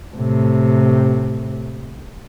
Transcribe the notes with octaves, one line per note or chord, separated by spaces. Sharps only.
A2 C3